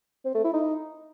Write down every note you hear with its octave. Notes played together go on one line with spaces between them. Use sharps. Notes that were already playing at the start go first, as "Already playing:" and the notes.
C4
A3
E4
D#4